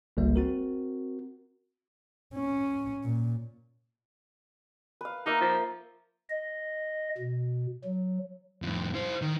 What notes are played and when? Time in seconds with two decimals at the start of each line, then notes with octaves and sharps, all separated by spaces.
0.17 G1 C#2 G3 A#3
0.36 C4 F#4 A#4
2.35 C#4
3.04 A#2
5.01 B4 F5
5.26 A#3 D#4 A#4 E5
5.41 F3
6.29 D#5
7.18 B2
7.85 F#3
8.62 F2 A2
8.94 E4 C5
9.22 D#3